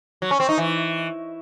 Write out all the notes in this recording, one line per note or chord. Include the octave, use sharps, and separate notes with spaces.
F#3
C#4
C4
D#4
E3